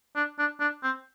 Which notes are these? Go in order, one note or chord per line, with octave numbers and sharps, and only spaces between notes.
D4
D4
D4
C4